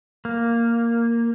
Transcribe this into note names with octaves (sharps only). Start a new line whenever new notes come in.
A#3